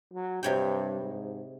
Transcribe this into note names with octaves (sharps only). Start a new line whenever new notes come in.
F#3
G2 C3 C#5 G5
G#2